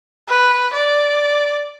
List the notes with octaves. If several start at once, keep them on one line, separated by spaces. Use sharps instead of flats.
B4
D5